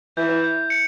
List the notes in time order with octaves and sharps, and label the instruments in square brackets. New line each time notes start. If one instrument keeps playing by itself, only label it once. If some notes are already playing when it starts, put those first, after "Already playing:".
[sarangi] E3 [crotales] G6
[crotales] G6
C#7